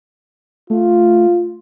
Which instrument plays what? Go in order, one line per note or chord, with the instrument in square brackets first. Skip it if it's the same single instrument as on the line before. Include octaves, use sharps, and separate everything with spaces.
[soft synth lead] A3 [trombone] F4